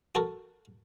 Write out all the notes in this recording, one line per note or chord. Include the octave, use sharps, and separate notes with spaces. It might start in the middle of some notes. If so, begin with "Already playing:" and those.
F#4 A4 A#4